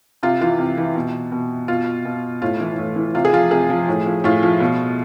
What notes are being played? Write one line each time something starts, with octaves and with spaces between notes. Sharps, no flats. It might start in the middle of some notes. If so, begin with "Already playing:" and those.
C3 F4
E3 F4
C3
E3
B2
B2
B2 F4
B2
A2 F4
E3
A2
E3
C3 F4
G#4
F3 F4
C3 G#4
F3
A2
F3
A2 F4
F3
B2